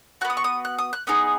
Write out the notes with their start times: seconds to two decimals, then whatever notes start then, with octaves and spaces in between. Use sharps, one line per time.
0.21 F#4 F#6
0.25 B3
0.30 D#6
0.37 C#6
0.44 D#6
0.65 F#6
0.78 D#6
0.93 F#6
1.07 B3 D#4 G#4 D#6